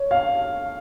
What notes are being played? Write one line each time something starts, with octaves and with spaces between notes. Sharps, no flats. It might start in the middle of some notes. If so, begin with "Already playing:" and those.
Already playing: C#5
F5